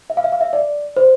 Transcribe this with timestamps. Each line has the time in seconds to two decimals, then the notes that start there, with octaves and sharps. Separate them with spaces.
0.10 E5
0.17 F5
0.24 E5
0.32 F5
0.41 E5
0.53 D5
0.97 C5